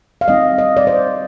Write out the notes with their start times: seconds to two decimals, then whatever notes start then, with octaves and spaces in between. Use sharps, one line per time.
0.21 F5
0.28 G3 C4 D#4 D#5
0.58 D#5
0.77 D5
0.87 C5